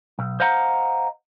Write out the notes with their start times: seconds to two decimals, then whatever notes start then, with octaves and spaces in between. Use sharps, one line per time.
0.19 B1
0.40 C5 D#5 F5 F#5 A#5